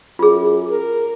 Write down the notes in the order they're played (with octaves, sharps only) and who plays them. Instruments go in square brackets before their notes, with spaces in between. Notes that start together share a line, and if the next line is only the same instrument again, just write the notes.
[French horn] F#2 [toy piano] F4 G#4
[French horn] A#4